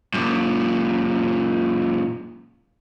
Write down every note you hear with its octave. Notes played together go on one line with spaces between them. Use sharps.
F#2 A#2